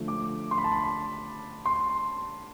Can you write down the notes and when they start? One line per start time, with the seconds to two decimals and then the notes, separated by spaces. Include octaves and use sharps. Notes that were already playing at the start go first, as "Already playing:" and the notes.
Already playing: D3 F3 A3
0.08 D6
0.51 C6
0.58 B5
0.64 A5
0.72 B5
1.66 C6